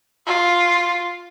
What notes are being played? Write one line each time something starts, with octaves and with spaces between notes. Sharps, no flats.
F4